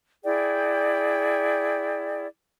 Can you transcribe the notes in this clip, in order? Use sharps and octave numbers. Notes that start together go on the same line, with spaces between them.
E4 G#4 D5 G5